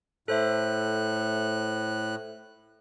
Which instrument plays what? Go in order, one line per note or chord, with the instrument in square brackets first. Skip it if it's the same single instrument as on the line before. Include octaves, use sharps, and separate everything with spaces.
[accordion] A2 F#6 [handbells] A4 C5 E5